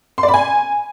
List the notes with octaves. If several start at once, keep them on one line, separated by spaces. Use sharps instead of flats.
C6
D5
B5
G#5